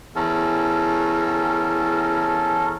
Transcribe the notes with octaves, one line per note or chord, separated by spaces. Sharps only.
E2 C#4 A4 A#4